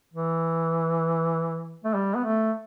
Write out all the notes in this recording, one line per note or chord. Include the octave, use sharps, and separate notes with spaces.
E3
A3
G3
B3
A3